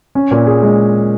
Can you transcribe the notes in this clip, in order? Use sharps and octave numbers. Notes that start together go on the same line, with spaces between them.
C#4
A#2
G#4
G#3